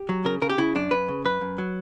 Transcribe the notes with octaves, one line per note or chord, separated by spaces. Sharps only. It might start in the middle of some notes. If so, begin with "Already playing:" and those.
Already playing: G4
F#3
C#3 A#4
C#3 A#4
G4
C#3 E4
F#2 D4
F#2 B4
C#3
F#2 B4
F#2
F#3